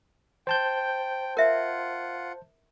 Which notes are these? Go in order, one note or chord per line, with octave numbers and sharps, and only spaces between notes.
C5 G5 A5 G6
F4 A#4 E5 F#5